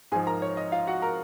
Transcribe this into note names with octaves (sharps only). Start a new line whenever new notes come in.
G#2 F3 G#4 G#5
A#4 A#5
C#5
D#5
F4 F5
F#4 F#5
A#4 A#5